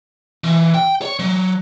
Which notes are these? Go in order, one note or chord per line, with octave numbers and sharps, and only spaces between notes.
E3
G5
C#5
F#3